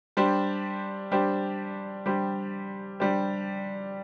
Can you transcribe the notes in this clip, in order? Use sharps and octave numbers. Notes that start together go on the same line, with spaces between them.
G3 D4 G4 C5
G3 D4 G4 C5
G3 D4 G4 C5
G3 D4 G4 C5